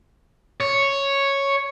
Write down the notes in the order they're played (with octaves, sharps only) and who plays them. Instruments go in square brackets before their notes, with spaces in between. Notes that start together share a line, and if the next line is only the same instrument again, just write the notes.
[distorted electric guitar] C#5